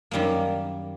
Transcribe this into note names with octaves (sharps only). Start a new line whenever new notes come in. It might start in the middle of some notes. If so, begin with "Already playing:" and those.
F#2 D#3 G3 A#3